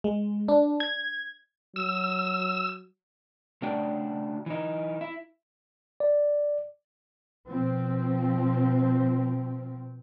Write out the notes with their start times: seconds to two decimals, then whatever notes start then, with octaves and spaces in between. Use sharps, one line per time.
0.04 G#3
0.48 D4
0.80 G#6
1.76 F#3 E6
3.62 C#3 A3 D4 F#4 D5 G5
4.46 E3 D#4
5.01 E4
6.00 D5
7.47 B2 F3 C4